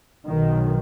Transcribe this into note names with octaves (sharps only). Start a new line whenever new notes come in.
B1 B2 D#3